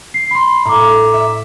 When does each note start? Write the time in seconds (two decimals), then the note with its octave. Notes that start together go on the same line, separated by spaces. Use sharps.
0.14 C7
0.31 B5 C6
0.65 A2 A#5 D6
1.14 E5